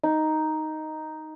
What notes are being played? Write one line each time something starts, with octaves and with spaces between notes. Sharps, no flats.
D#4